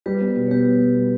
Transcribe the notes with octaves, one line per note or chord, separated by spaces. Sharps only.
G3 G4 B4
B3
B2
C#5
B3 G4 B4
G3
B2
G3